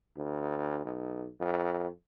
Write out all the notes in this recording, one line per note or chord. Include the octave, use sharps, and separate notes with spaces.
D2
B1
F2